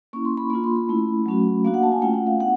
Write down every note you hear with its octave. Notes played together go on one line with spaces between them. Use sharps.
A#3 C#4 E4 C#6
C6
B5
A#3 D4 F4 B5
C6
B5
A3 C#4 E4
F#3 A3 C#4 F#4
A#3 D4 F#4 F5
F#5
A5
G#5
A3 C#4 F4 G5
F#5
F5
B3 D4 F#5